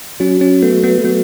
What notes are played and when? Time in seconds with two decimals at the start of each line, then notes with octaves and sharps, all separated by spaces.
0.20 F#3 C#4
0.41 C#4
0.62 A3 B3
0.83 B3
1.04 F#3 B3